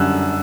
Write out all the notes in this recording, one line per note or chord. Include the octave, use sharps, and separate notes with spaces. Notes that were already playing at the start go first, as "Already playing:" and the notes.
Already playing: F#2 D3 G3 E6 F#6